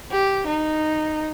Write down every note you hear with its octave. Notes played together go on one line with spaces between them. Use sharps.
G4
D#4